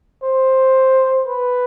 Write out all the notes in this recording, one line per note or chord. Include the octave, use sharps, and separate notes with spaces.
C5
B4